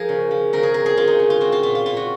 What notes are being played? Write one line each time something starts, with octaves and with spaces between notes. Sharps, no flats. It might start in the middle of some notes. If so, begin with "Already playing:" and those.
Already playing: F3 G#4 A#4
C#3
F3
C#3 A#4
G#4
C4 A#4
G#4
C#3 F4
D#4
C#3
F4
C4 F#4
F4
A#2 F4
F4
A#2 F4
F#4